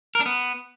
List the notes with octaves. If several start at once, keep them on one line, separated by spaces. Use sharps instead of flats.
A#4
D4
B3